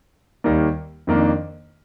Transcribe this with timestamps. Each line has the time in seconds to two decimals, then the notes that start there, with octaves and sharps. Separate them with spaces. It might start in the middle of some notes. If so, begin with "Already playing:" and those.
0.44 D#2 D#3 G3 A#3
1.07 F2 D#3 A#3 D4